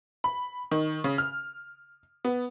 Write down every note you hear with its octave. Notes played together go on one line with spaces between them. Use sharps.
B5
D#3
C#3
F6
B3